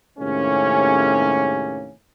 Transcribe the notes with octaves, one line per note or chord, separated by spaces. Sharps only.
D#2 A2 C3 G#3 A#3 C#4